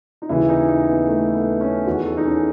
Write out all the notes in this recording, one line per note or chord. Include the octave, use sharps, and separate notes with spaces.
D#4
D#2 C#3 E3 E4
D#4
D#4
B3
A3
B3
C#4
E2 D#3 F#4
A4
D#4
C#4